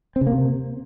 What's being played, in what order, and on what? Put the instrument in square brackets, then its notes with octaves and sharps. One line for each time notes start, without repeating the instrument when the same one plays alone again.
[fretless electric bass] C4
C#3
A#3
C3